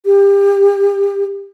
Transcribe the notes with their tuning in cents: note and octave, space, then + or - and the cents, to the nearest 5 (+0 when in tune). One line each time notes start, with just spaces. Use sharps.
G4 +30